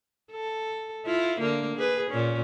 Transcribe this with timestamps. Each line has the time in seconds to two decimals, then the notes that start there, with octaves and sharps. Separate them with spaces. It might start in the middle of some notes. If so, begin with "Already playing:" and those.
0.31 A4
1.06 E4 F4
1.39 D3 A#3
1.76 G#4 B4
2.10 A#2 C#4